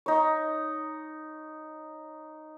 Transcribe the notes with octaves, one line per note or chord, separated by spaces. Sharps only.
D#4 C#5